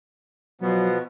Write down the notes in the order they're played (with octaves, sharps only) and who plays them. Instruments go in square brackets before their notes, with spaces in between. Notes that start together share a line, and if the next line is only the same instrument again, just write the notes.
[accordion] B2 F3 B3 [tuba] F#3